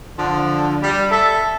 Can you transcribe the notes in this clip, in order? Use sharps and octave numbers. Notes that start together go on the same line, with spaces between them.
D3 F3
G3
A4 E5